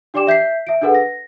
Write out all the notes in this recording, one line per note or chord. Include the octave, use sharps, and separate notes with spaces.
D4 G4 D5 G5 D6 E7
E5 G6 B6 C7
E5 D7
D4 G#4 A4 B4 F#5
A#6